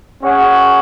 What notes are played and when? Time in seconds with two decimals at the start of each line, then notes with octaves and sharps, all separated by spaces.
0.22 C#4 G#4 C#5 F#5